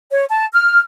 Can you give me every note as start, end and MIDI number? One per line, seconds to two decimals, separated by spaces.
0.11 0.24 73
0.30 0.45 81
0.53 0.80 89